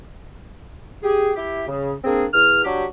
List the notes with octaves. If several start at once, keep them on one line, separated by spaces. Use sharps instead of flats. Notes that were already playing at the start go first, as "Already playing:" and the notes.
G4 G#4
E4 G4
C#3
A#3 C4 D4 G#4
E2 F6
F#3 D4 F#4 G4